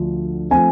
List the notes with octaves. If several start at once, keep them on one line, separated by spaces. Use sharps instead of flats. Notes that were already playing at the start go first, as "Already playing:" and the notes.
Already playing: D2 D3 F3
F3 A3 C4 G#5